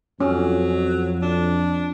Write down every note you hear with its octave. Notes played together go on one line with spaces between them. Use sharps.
F2 F#3 C#4
D4